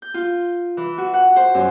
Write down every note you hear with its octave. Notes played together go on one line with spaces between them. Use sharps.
G6
F4
E3
F#4
F#5
C5
F#2